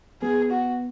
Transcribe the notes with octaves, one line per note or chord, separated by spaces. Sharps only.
B3 G#4
F#4